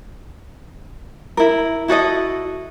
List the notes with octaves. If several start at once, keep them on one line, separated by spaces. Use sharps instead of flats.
E4 A#4
E4 F#4 A4 D#5